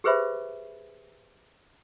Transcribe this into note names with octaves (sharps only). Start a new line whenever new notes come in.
G4 G#4 B4 C5 E5 B5